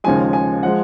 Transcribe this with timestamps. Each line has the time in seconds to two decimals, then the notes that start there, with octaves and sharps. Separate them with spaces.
0.04 D#2 C#3 F3 G#3 G#5
0.33 G#5
0.63 F3 G#3 F#5